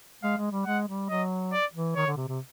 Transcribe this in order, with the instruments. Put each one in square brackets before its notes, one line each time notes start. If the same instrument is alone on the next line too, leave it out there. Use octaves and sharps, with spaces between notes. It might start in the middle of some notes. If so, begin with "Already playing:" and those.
[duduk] G#3 [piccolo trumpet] F5
[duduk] G#3
G3
[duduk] G#3 [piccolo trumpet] F#5
[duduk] G3
[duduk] F#3 [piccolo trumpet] D#5
[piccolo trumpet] D5
[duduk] E3
[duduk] D#3 [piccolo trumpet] C#5
[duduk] D3
C3
C3